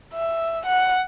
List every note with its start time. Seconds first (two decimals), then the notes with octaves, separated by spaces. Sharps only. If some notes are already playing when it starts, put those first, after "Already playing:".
0.13 E5
0.66 F#5